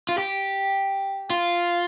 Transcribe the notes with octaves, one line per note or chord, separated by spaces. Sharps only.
F4
G4
F4